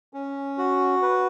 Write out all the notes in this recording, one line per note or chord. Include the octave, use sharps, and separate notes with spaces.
C#4
F#4
B4